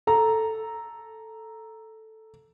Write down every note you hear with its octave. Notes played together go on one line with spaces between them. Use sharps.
A4 A#5